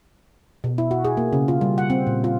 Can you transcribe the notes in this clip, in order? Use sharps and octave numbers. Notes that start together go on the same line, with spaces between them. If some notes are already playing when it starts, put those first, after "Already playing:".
B2
E4
F#4
G#4
A#3
C#3
F4
G3
F#5
C4
A#2
F4